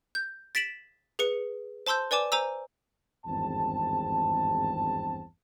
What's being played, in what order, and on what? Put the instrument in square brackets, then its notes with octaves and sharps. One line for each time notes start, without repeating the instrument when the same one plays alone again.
[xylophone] G6
A6 B6 D7 E7 F#7
G#4 B4 C#7
C5 A5 C6 E6 G6
B4 D5 G#5 D6 E7
C5 G#5 A#5 E6
[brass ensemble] G#1 E2 G2 C4 A5